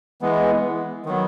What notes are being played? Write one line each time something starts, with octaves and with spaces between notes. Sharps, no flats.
E3 G#3 B3
D#3 F#3 B3